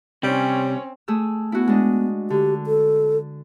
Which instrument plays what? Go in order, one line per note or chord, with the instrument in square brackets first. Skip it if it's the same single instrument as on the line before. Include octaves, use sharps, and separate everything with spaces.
[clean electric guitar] C3 [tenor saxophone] G3 [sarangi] C4 [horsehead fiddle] C#4 C#5
[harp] A3 G#4 E6
[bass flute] B3 [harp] E4 F#4
[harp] G#3 D4 D#5
[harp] D3 [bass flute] G4
[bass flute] A4